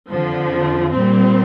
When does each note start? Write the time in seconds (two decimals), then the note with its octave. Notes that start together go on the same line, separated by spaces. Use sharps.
0.11 F2 D3 F3
0.93 A#2 G3 C4